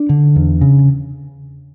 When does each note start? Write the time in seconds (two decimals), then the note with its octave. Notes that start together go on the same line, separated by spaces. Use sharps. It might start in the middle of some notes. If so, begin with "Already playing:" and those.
Already playing: D4
0.09 D3
0.36 E2
0.61 C#3